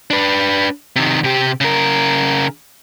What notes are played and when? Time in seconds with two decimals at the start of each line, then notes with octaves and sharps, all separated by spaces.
0.10 D4 B4
0.96 C3 D#3
1.24 C3 G4
1.61 C#3 A#4